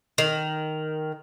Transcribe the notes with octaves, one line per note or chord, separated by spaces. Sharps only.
D#3